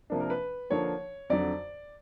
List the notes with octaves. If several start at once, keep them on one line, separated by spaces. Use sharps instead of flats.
C3 F3 A#3 D4
A#4
B4
D3 F3 A#3 D4 C#5
F2 D3 F#3 D5